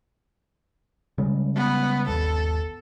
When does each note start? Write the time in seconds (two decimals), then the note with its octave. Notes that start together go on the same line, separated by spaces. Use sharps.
1.18 C#3 G3 G#3
1.55 B3
2.08 G1 D#2 A4